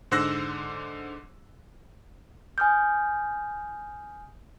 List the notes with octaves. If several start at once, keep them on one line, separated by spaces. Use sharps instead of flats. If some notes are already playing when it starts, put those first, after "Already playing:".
G#2 D3 C5 E6 F#6 A#6
G#5 D#6 F6 G6